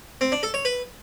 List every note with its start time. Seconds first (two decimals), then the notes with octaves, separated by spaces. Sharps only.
0.21 C4
0.32 D4
0.43 A4
0.54 C#5
0.65 B4